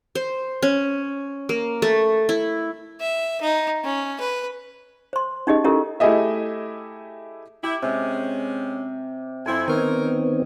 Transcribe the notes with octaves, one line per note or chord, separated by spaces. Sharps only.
C5
C#4
A#3
A3
E4
E5
D#4
C#4
B4
C5 C6
C#4 D#4 G4 G#4 D#5
C#4 E4 G4 A4 A#4
A3 E4 G4 G#4 D#5 E5
E4 G4
C3 G#3 C#4
F2 C4 E4 G#5 C6
D#3 B3 C4 D#4 A#4 C#5 D#5